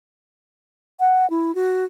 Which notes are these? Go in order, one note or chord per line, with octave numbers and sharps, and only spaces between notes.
F#5
E4
F#4